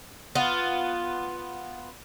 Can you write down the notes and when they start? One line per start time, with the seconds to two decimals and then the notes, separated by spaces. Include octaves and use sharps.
0.35 B3 F4